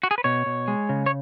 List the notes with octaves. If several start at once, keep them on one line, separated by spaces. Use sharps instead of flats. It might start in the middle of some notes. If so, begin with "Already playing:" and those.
F#4
G#4
B4
B2 C#5
B2
G#3
C#3
C#5